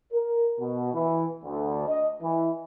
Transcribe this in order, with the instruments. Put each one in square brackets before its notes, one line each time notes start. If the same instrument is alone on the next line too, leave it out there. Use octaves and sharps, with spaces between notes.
[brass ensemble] A#4
B2
E3
D2
D#5
E3